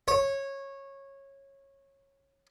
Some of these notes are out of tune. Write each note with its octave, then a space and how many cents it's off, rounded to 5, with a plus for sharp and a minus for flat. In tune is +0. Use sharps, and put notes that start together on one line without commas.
C#5 -15